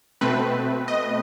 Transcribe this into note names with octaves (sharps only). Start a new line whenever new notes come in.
B2 A3 C4 B4
D#5